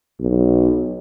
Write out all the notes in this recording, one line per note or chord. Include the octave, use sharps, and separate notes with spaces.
B1